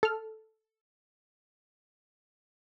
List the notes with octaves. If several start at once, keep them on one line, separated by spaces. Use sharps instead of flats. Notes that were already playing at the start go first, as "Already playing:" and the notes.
A4 F6